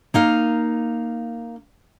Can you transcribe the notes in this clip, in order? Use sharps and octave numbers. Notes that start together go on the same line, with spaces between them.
A#3 D#4 F5